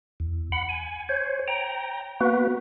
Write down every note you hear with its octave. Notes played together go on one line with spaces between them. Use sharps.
E2
F#5 B5
G#5
C5 C#5
G5 A#5
A#3 B3 F#4 B4